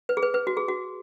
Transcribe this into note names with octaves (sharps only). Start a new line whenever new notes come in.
B4
G#4
B4
B4
F#4
G#4
F#4